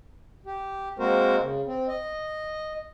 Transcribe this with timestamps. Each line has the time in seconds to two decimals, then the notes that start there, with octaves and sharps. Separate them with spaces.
0.46 G4
0.99 G#3 A#3 C4 F#4 A#4 C5
1.42 C#3
1.67 C4
1.88 D#5